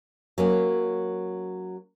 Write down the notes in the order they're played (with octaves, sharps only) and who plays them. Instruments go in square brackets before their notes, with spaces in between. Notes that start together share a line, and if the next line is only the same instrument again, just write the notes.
[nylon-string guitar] F#3 A#3 C#4